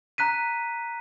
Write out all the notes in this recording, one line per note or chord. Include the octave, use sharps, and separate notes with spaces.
A#5 F#6 B6 D#7